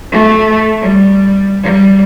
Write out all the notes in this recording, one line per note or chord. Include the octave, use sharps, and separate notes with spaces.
A3
G3
G3